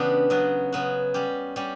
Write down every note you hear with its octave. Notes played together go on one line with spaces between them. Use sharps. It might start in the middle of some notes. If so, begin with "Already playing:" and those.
Already playing: C#3 E3 B3 D4 G4
C#3 F#3 B3 F#4
C#3 F#3 B3 F#4
G3 C#4 G4
G3 C#4 G4